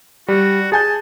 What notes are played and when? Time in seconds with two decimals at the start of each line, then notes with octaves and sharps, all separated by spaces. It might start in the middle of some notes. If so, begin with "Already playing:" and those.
0.28 G3 F#4
0.72 G#4 G#5 A5 G6